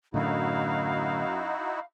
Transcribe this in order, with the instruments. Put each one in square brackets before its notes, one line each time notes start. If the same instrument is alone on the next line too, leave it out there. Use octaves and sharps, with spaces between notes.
[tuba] F#2 [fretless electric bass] A2 D3 [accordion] D#4 E4 F#4 [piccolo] F5